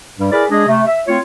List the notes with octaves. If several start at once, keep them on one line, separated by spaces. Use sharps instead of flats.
G2 G3
E4 G#4 A#4 B4 D5
G#3 D4 G#4 D#5
C3 A3
E5
A3 C4 F4 C#5